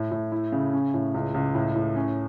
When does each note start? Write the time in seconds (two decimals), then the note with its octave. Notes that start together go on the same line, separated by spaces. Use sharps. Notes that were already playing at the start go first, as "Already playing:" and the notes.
Already playing: A2
0.11 A2
0.32 E4
0.52 C#3
0.73 C#4
0.94 A2
1.14 C#2
1.34 C#2
1.55 A2
1.76 A2
1.96 C#4